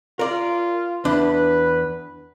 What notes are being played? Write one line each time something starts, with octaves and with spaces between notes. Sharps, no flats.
F4 A#4 D5
E2 D4 B4